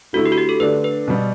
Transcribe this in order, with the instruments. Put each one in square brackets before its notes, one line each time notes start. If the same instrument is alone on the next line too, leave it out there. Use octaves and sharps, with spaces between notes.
[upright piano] D3 A3 E4 [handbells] F#4
[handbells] G4
F#4
G4
A4
[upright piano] D3 A3 D4 [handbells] B4
[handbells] B4
[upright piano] B2 G3 B3